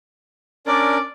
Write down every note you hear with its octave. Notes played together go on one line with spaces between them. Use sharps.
C#4 D4 A#4 D5